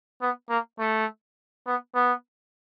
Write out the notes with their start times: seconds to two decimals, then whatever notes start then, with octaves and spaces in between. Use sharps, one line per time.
0.21 B3
0.50 A#3
0.79 A3
1.66 B3
1.95 B3